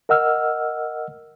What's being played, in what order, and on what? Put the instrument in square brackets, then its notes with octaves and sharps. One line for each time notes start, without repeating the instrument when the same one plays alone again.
[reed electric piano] A#4 D#5 F#5 E6 F6